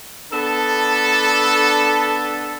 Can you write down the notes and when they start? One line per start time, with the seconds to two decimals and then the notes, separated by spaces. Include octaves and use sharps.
0.32 B3 D4 A4